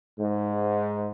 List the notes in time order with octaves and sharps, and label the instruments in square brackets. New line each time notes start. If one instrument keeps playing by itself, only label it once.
[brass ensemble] G#2